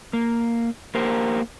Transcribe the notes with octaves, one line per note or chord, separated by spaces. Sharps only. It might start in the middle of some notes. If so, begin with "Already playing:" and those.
A#3
A#3 G4 A#4 C5